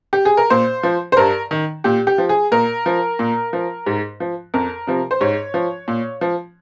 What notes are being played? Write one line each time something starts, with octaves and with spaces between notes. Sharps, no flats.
G4
G#4
A#4
A#2 C5
F3
C5
G2 A#4
D#3
A#2 G4
G4
F3
G#4
A#2 A#4
F3
A#2
F3
G#2
F3
F2 A#4
C3 F3
C5
G#2 C#5
F3
A#2
F3